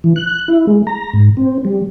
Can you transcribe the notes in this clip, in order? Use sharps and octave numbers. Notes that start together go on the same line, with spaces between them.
E3
F#6
E4
G#3
A#5
G#2
C4
G3